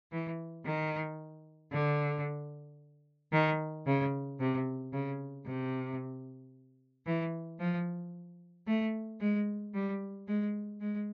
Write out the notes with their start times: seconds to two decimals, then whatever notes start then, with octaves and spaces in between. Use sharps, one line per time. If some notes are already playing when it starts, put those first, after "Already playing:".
0.12 E3
0.65 D#3
1.72 D3
3.33 D#3
3.87 C#3
4.40 C3
4.93 C#3
5.46 C3
7.06 E3
7.59 F3
8.67 A3
9.20 G#3
9.74 G3
10.28 G#3
10.80 G#3